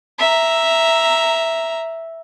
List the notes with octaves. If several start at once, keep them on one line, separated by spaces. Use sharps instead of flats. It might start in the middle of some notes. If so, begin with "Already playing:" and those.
E5 A#5